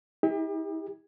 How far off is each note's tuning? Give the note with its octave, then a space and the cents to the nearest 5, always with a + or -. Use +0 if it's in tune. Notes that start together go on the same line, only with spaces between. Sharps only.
E4 -45 G4 +40